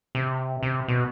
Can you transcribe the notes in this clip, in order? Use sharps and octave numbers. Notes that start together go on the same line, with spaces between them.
C3
C3
B2